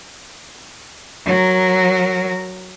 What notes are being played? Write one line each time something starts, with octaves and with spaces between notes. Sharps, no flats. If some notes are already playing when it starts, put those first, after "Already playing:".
F#3 A#4